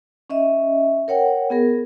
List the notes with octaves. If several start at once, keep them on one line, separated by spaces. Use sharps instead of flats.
C#4 D#5 E5
A#4 C#5 F#5 G5
B3 G#4 A#4